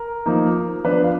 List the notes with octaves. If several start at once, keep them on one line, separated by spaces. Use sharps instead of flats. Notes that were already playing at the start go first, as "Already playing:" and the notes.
Already playing: A#4
F3 A#3 D#4
F3 B3 D4 B4
F5